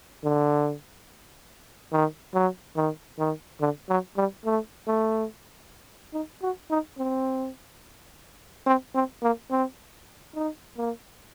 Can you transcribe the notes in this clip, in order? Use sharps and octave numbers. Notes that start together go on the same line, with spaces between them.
D3
D#3
F#3
D#3
D#3
D3
F#3
G3
A3
A3
D#4
F#4
D#4
C4
C4
C4
A#3
C4
D#4
A#3